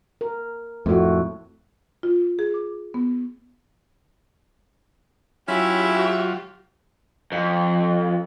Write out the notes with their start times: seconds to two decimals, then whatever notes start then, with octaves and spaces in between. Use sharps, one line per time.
0.21 A#4
0.86 F2 A2 A3 F#4
2.03 F4
2.39 G#4
2.54 D6
2.94 B3
5.48 F#3 C#4 E4 F4 G4 E5
7.32 F2